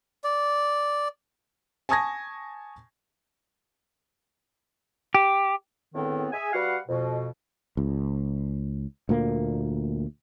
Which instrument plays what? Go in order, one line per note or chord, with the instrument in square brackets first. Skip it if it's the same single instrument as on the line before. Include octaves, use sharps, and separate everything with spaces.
[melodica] D5
[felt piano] G#5 A5 C#6 D#6 G#6 A#6
[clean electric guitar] G4
[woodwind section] E2 A2 D3 D#3 B3 C4
G#4 E5 G#5
G3 F#4 B4 F5 F#5
F2 B2
[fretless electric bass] C#2
D2 A#2 A#3